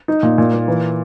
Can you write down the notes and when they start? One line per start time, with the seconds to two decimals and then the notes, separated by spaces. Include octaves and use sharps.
0.08 D#4
0.23 A#2
0.38 A#2
0.53 A#3
0.68 E3